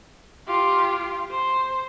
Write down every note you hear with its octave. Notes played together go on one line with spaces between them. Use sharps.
F4 G4
C5